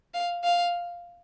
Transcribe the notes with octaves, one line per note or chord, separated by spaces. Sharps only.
F5
F5